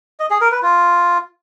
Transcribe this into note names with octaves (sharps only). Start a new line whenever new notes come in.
D#5
G#4
A#4
B4
F4